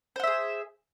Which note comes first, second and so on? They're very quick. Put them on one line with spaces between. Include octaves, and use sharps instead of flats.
C5 F#5 E5 G#4